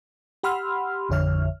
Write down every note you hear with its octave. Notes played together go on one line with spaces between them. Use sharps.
G4 F#5 B5 C6 E6 F6
A1 F2 D3 C#5 E5 F6